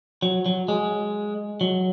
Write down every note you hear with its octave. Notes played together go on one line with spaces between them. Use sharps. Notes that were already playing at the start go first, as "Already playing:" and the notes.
F#3
F#3
G#3
F#3